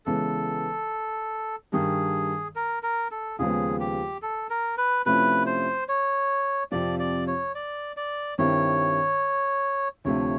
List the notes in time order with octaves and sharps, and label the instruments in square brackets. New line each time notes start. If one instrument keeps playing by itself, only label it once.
[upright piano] C#3 E3 G#3 B3 [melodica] A4
[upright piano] G2 D#3 G3 [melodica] G#4
[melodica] A#4
A#4
A4
[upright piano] D#2 C#3 F3 G#3 B3 [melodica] G#4
[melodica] G4
A4
A#4
B4
[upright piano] C3 F3 A3 C#4 E4 [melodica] B4
[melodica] C5
C#5
[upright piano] F2 C3 F3 [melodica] D5
[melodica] D5
C#5
D5
D5
[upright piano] G2 D#3 G3 C4 E4 [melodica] C#5
[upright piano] D2 C3 F3 A3 [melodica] C#5